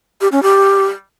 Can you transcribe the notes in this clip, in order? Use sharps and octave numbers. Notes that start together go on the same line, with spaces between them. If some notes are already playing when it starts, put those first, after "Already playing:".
G4
C#4
G4